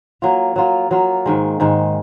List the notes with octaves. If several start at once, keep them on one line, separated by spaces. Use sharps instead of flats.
F#3 A#3 F4
F#3 A#3 F4
F#3 A#3 F4
G#2 D#3 G#3
G#2 D#3 G#3